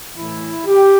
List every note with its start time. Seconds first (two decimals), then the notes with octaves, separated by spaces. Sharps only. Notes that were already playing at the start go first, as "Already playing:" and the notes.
0.15 A2 E3 E4
0.66 G4